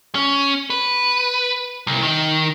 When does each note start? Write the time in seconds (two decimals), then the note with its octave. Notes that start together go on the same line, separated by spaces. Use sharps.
0.15 C#4
0.70 B4
1.87 C2
2.03 D#3